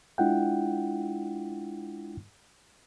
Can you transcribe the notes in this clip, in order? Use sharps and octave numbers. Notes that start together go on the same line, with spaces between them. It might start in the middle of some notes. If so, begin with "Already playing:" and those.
G#3 D4 E4 F4 F#5 G5